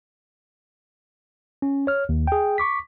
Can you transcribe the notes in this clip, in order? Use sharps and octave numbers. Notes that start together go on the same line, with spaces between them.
C#4
C#5 F6
D#2
G#4 G5
C#6 D6 B6